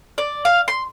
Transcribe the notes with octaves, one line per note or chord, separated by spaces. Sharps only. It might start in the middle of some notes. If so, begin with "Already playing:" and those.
D5
F5
C6